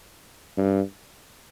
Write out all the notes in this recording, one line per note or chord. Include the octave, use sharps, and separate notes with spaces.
G2